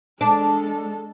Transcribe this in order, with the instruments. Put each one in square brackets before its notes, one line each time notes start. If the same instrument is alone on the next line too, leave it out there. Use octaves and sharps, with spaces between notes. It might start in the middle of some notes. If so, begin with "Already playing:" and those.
[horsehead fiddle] G#3 A4 [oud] D4